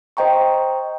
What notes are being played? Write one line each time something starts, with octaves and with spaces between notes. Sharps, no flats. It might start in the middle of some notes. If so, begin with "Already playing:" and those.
C5 D#5 G5 A#5 C#6